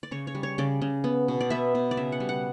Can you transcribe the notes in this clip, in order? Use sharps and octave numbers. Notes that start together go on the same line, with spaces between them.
D5
C#3 C#5
C#5
G3
C#5
C#3 D5
C#3
B3
B2
D5
B3 E5
B2
D5
C#3 E5
F#5
G3
F#5